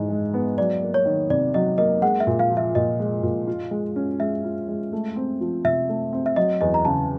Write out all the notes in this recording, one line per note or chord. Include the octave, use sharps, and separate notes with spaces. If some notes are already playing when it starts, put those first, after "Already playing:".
Already playing: G#2 E3 D#5
G#3
B3
F#3 D5
A#3
C#5
D#3
C3 D5
F#3 D#5
A#3 D#5
G#3 F#5
E5
A#2
F5
F3
E5
A#2 D#5
G#3
A#2
F4
G#3
C#4
G#3 E5
F4
G#3
A3
C4
F3
C3 E5
A3
C4
E5
F#3 D#5
E2 D#5
A#5
C#3 A5